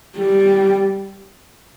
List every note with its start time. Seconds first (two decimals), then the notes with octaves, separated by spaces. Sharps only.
0.17 G3